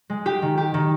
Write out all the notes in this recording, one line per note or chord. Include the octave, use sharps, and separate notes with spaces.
G#3
G4
D#3
G4
D#3